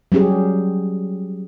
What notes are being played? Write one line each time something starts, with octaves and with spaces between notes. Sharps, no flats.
F#3 G3 C#4 G4 G#4